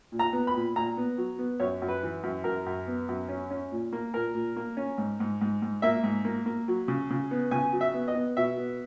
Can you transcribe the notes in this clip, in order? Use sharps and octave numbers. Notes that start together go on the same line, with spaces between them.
A#2
A#5
B3
B5
A#2
A#2 A#5
B3
F#3
B3
F#2 C#5
F#2
B4
E3
F#2
F#2 A#4
F#2
B3
F#2
C#4
C#4
A#2
A#3
A#2 A#4
A#2
A#3
C#4
G#2
G#2
G#2
G#2
A#3 E5
G#2
A#3
A#3
F#3
C#3
C#3
B3
C#3 G#5
F#3
E5
B3
D#5
B3
B2 E5
B3